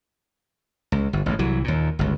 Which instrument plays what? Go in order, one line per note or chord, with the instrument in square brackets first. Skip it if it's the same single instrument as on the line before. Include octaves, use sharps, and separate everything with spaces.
[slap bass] C#2
G1
A1 G#2
C2 E3 F#3
D#2 A#2
G1 C#2